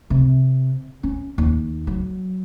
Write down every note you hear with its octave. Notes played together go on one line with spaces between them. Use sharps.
C3
C#4
D#2
F#3